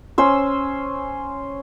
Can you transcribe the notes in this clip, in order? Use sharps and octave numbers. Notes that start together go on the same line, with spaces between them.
C#4 C5 E6